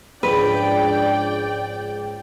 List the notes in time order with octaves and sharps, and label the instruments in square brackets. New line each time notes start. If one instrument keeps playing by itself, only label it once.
[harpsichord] C#2 G#2 F3 [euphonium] D4 [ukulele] B4 [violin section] D5 G5